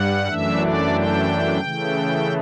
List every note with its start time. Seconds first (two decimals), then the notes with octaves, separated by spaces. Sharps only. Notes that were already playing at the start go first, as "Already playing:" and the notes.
Already playing: G2 G3 F#5
0.28 F#2 E3 A3 D4 E5
0.61 D5
0.94 G5
1.61 C#3 E3 A3